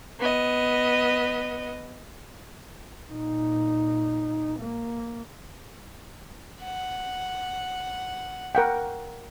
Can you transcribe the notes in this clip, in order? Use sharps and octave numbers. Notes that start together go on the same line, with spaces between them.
B3 D#5
A#2 D#4
A#3
F#5
A#4 F#5 G5